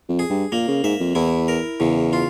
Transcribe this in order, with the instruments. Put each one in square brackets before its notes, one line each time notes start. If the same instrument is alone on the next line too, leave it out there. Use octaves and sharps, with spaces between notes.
[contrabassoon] F2
[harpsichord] G#4
[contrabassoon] G2
[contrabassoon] A#2 [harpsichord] A#3
[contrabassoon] C#3
[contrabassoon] G#2 [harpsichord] E5
[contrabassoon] F2
[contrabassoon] E2 [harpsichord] E4
[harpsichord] A#4
[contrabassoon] E2 [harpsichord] C#3
[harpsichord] F4